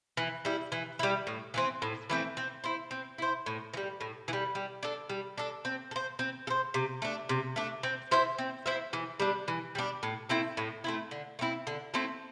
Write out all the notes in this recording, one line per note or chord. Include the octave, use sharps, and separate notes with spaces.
E3
G3 E4
E3
G3 E4
A2
E3 A3 C4
A2
E3 A3 C4
C4
E4 C5
C4
E4 C5
A2
E3
G3
A2
E3
G3
G3
D4 A4
G3
D4 A4
C4
A4
C5
C4
A4
C5
C3
A3 D4
C3
A3 D4
C4
E4 C5 E5
C4
E4 C5 E5
E3
G3 D4
E3
G3 D4
A2
A3 C4 E4
A2
A3 C4 E4
D3
A3 C4 E4
D3
A3 C4 E4